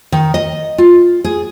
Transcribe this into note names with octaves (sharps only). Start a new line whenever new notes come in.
D#3
D#5
F4
G#4